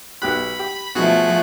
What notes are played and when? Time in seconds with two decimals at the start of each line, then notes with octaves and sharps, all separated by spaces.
0.22 B1 G4 B5 F#6
0.59 G4
0.95 B2 F3 A3 F#4 G#4 F#6